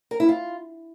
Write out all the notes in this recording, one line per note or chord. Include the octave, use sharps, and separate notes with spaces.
A#4
E4
F4